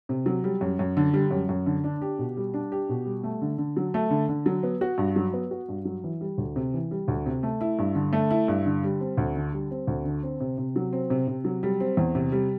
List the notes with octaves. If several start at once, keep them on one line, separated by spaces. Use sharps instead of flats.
C3
F#3
G3
F#2
F#2
D3
G3
F#2
F#2
D3
D4
G4
B2
G3
D4
G4
B2
G3
A3
D3
D3
F#3
A3
D3
D3
F#3
B3
F#4
G2
F#3
B3
F#4
G2
F#3
E3
G3
D2
C3
E3
G3
D2
C3
A3
E4
G2
D3
A3
E4
G2
D3
G3
C4
D2
D3
G3
C4
D2
D3
C4
C3
C3
F#3
C4
C3
C3
F#3
G3
C4
E2
C3
G3